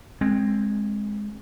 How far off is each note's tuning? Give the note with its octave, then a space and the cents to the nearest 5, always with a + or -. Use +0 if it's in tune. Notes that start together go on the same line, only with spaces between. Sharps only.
G#3 +0 C4 +20